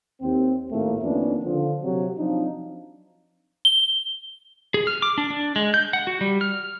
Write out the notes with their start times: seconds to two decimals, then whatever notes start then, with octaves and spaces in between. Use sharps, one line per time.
0.22 D#2 C4
0.71 G#1 D#2 A2 A3 A#3
1.02 F2 D#3 A#3 B3 C#4 D4
1.43 D3 F3
1.83 C3 F#3
2.18 F3 F#3 C4 D4 D#4 F4
3.65 G7
4.74 G#4
4.87 F6
5.02 D6
5.18 D4
5.30 D4
5.56 G#3
5.74 G6
5.93 F#5
6.07 F#4
6.21 G3
6.41 F6